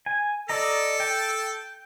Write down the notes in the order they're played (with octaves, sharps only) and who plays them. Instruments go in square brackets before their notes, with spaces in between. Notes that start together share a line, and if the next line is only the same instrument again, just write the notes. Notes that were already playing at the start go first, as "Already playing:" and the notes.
[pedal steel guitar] G#5
[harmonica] A4 [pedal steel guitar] D5 D#5 A#5
[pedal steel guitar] G5